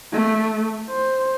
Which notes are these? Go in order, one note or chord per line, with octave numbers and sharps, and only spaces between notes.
A3
C5